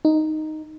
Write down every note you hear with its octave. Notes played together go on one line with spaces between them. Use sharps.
D#4